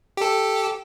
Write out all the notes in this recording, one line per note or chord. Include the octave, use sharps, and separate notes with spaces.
G4 A4